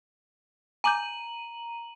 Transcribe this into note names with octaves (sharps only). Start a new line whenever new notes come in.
G#5 A#5 D6 G6 D#7 F#7